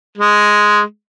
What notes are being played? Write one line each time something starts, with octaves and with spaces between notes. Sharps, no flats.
G#3